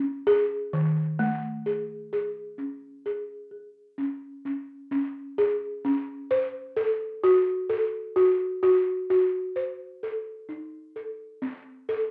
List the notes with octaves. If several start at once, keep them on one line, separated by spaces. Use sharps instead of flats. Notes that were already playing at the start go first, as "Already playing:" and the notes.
Already playing: C#4
G#4
D#3
A3
G#4
G#4
C#4
G#4
G#4
C#4
C#4
C#4
G#4
C#4
C5
A4
F#4
A4
F#4
F#4
F#4
C5
A4
D#4
A4
C4
A4